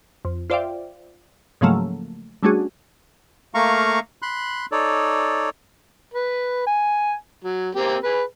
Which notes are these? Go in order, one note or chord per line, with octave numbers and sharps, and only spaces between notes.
F2
F4 C5 D5 E5 F5 G5
G#2 C#3 F3 F#3 A3 A#3
G3 A3 C#4 D4 F#4 G#4
A3 A#3 F5 A#5 C#6
B5 C6 F#6
D#4 A4 C#5 D5
B4
G#5
F#3
A#3 C4 G4
G#4 B4